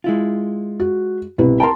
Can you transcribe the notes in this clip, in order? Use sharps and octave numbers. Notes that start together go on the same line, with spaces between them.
G#3 E4 F4
F#4
C2 B2 E4 B4
A#4 G5 A5 A#5 C6